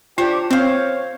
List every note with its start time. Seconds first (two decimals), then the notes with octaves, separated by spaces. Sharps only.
0.18 D4 F4 G4 C5 C#5 A#5
0.51 C4 C5 C#5 F5